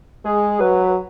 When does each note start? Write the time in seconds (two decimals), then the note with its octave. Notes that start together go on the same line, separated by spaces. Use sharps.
0.25 G#3 G#4
0.61 F#3 B4